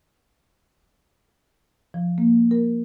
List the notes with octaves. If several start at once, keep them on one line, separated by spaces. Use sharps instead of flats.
F3
A#3
A#4